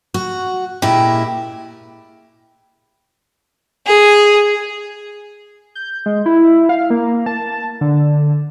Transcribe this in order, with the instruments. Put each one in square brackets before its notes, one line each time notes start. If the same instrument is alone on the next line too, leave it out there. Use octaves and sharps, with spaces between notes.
[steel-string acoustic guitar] F#4
[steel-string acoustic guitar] A#2 G#3 E4 [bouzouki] G4
[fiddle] G#4
[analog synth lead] G6
G#3
E4
F5
A#3
A5
D3